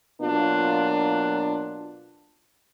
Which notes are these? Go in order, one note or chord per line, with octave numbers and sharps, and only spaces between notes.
B2 F#3 A#3 D4 F4